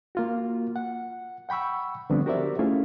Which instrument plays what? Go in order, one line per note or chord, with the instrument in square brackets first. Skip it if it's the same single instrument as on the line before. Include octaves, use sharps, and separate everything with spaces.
[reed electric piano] A#3 F4 F#4
F#5
F#5 G5 B5 C#6 E6
D3 F3 G3 B3 C4 D4
F#4 G4 A#4 C5 D5 E5
A3 C#4 E4 F4 G#4